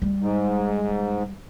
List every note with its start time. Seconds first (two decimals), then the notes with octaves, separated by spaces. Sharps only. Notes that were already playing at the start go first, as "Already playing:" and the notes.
0.02 G3
0.21 G#2